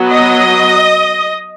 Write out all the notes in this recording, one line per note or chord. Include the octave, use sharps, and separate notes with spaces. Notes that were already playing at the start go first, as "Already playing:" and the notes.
Already playing: F#3 B3
D#5